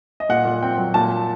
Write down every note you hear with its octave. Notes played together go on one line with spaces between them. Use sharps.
D#5
A#2 F#5
A#2
C4 G5
F#3
A#2 A5